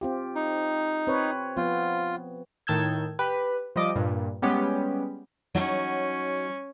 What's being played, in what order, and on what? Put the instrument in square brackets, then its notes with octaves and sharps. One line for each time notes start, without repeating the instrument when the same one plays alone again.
[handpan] C4 F4 G4
[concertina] D#4
[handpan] C4 B4 C#5
[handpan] F3 B3 [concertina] F4
[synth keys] A2 D#3 A5 E6 G6 G#6
G4 B4
F3 G3 D#5 D6
G2 A#2
G3 G#3 B3 C#4 G4
[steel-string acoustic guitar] F#3 D#4 F#4 [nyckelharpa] C#4